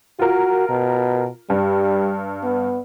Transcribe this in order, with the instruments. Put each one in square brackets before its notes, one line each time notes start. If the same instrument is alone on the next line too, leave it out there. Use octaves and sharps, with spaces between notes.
[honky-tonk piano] F4 A#4 [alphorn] F#4
[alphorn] B2
[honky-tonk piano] G2 [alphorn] G3
[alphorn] B3